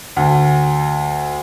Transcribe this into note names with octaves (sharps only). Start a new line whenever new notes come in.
D2